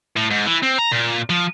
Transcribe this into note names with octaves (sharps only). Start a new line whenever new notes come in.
A2
G#2
E3
C4
A#5
A#2
F3